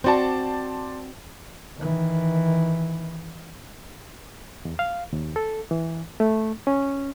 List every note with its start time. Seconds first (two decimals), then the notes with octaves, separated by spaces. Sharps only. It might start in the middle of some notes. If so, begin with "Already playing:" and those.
0.04 C4 F#4 C5 D5 A5
1.78 D#3 E3
4.65 E2
4.79 F5
5.13 D#2
5.36 A4
5.71 E3
6.20 A3
6.67 C#4